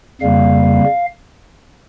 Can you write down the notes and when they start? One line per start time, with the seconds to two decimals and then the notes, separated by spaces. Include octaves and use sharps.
0.21 F2 C#3 G3 A#3 F5